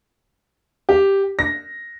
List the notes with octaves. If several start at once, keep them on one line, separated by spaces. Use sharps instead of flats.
G4
A#6